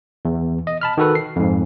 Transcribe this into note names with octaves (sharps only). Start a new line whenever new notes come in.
E2
D#5
A5 B5 F6
D#3 F#4 A4 B4
C7
F2 G#2